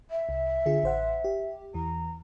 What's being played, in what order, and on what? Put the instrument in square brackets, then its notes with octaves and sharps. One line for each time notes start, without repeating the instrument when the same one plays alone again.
[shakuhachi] E5
[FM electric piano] C2
D3 F4 G#4
A1 C5 F#5
G4
[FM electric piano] E2 E3 [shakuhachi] A#5